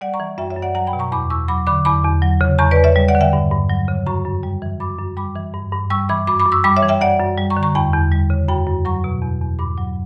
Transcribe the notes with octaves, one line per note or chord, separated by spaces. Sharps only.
G3 D5 F#5
A#5 C#6
E3
F#2 E5 G5
C#5 E5
F#2
D5 F#5
F#3 F#5 A#5
G5 B5
B2
A#5 C#6
E2 B5 D6
E2 C#6 E6
F#3 B5 D6
D3 B5 D6
E2 B5 D6
E2
F#3
C#3
E2 A#5 C#6
B4 D5
E2
C#5 E5
G3
D5 F#5
D3
E5 G5
G2
G2
F#3
C#3
F#2 A#5 C#6
F#2
G3
E3
F#2 B5 D6
F#2
G3 B5 D6
E3
G2
G2
G3 C#6 E6
E3 B5 D6
F#2 B5 D6
B5 D6
F#2
C#6 E6
G3 B5 D6
C#5 E5
E3
E5 G5
F#2 D5 F#5
F#2
G3
A#5 C#6
D3
A#5 C#6
E2 G5 B5
E2
G3
C#3
F#2 G5 B5
F#2
F#3 A#5 C#6
B2
E2
E2
G2 B5 D6
F#3